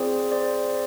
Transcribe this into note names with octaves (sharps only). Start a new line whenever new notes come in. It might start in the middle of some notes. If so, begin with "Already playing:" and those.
Already playing: C4 F4 G#4 C5 D5
C5 D5